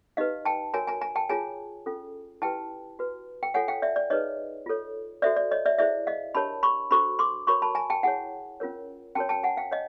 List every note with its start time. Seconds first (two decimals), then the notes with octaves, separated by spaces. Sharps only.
0.17 D#4 G4 B4 D#5 F5
0.45 G5 A5
0.74 F#4 A#4 C#5 G#5 A#5
0.87 G#5 A#5
1.01 G#5 A#5
1.16 G5 A5
1.29 F4 G#4 C#5 G#5 A#5
1.86 C#4 F4 A4
2.42 E4 G4 B4 G5 A5
2.99 F#4 B4
3.43 G5
3.54 F4 A4 C#5 F#5 G#5
3.68 F5 G5
3.82 D5 E5
3.96 D5
4.10 D#4 G#4 B4 C#5 D#5
4.66 F4 A4 C#5
5.22 F#4 A4 C5 D5 E5
5.36 D5
5.51 C#5 D#5
5.66 D5 E5
5.78 E4 G#4 C5 D5 E5
6.07 D#5 F5
6.35 D4 G4 A#4 C#5 A5 B5
6.63 B5 C#6
6.91 D4 F#4 A4 C5 B5 C#6
7.19 C6 D6
7.47 F#4 A#4 C#5 B5 C#6
7.62 A5 B5
7.75 G#5 A#5
7.90 G5 A5
8.03 E4 G#4 C#5 F#5 G#5
8.60 C#4 F4 A#4 C#5
9.15 C#4 F#4 A#4 C#5 G5 A5
9.29 G5 A5
9.43 F#5 G#5
9.57 F5 G5
9.71 C#5 D#5 F5